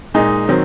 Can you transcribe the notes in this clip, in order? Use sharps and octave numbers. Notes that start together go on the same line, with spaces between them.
A#2 G#3 D#4
D#3 F#3 C4